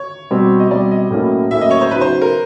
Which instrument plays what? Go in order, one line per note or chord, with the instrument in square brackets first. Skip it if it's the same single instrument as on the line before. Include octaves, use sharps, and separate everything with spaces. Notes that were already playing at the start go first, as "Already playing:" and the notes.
Already playing: [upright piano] C#5
[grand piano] B2 G3 C4
[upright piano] D#5
[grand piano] B2 G3 C4 [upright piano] D5
[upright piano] D#5
[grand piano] A2 F#3 A#3 C#4 E4
[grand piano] A2 F#3 A#3 C#4 E4 [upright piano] E5
[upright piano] D#5
C#5
C5
[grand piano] C#3 F#3 B3 D#4 F#4 [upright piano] B4
[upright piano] C5
A#4